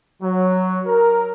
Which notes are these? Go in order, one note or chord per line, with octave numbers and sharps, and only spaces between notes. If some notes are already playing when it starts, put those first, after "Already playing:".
F#3
A#4